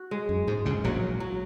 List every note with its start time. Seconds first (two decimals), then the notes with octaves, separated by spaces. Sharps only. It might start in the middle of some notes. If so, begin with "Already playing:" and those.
Already playing: F#4
0.11 G#3
0.29 F#2
0.47 G#2 G#3
0.65 C#2 C#3
0.84 A#1 A#2 F#3
1.20 F#3